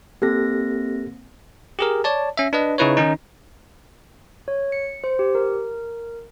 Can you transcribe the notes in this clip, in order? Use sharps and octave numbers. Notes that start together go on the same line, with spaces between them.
A#3 C4 G4 A4 A#6
G4 G#4 A#4
C#5 D5 A5
C#4 E5
D4 B4 D#5
C#3 D#4 E4 B4 C#5
D#3 C#4 D#4
C#5
C#7
C5
G4
A#4